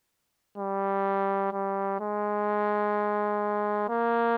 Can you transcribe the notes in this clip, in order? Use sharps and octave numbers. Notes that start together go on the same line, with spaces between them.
G3
G3
G#3
A#3